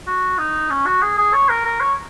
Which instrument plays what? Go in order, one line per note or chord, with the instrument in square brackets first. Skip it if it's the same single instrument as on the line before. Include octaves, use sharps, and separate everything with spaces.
[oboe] F#4
D#4
C#4
F#4
G#4
G#4
C#5
A#4
A#4
C#5